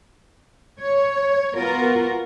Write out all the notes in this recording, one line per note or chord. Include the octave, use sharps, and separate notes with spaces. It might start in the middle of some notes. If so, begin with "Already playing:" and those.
C#5
B3 F4 F#4 A#4